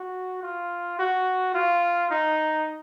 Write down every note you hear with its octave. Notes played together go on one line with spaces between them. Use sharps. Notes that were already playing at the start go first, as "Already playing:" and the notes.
Already playing: F#4
F4
F#4
F4
D#4